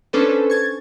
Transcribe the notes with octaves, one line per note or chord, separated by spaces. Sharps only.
C#4 D4 A4 B4 C5
C#6 G#6 A6